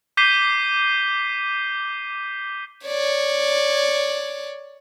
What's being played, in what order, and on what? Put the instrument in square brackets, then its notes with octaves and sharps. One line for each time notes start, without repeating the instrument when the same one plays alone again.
[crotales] D6 G6 B6 C7 D#7 G7
[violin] C#5 D5